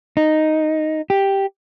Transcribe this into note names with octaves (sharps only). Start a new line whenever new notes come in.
D#4
G4